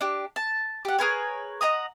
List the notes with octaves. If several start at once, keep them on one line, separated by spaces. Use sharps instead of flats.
D4 G4
A5
G4 F#5
G#4 A#4 B4 C#5
D#5 F#5 A#5 D#6